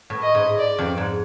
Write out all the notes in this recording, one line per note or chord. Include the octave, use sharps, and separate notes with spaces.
A2
D#5
G#2
D5
F2
G#2